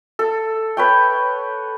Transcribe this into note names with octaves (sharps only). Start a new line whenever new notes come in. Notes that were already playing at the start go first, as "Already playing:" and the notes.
A4
B4 C#5 G5